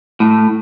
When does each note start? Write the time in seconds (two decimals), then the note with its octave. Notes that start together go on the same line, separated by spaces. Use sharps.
0.20 A2